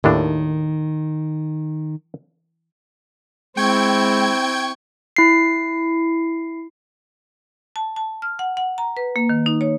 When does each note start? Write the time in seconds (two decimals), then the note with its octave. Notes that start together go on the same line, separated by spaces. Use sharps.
0.04 D#2 A2 D#3 D4
3.57 G#3 C4 E4 G5 C#6 G#6
5.17 E4 C7
7.76 A5
7.96 A5
8.22 F6
8.39 F#5
8.57 F#5
8.78 A#5
8.97 B4
9.16 A#3
9.29 D#3
9.46 D#4
9.61 C#5